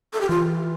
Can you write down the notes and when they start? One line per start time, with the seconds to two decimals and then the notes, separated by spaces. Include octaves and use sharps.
0.14 A4
0.21 G4
0.29 E3 F4